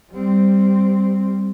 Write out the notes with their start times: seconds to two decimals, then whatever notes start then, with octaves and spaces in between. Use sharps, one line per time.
0.12 G3 C4